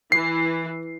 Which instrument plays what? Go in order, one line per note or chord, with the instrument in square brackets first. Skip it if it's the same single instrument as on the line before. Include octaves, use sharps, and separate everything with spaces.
[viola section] E3 [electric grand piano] C7